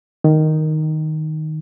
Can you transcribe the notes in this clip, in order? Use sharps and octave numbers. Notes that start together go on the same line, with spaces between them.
D#3